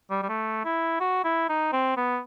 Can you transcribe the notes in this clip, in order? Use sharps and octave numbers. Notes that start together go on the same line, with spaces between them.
G3
G3
A3
E4
F#4
E4
D#4
C4
B3